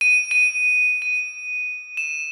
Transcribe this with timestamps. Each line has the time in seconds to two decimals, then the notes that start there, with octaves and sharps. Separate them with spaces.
0.01 D#7
0.31 D#7
1.02 D#7
1.97 E7